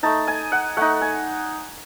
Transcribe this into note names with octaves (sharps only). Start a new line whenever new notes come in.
A3 D#4 A5
G#5
F#5
A3 D#4 F#5
G#5